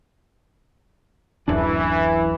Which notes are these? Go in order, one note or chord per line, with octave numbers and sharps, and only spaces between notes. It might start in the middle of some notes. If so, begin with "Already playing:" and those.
D1 F#2 E3 D4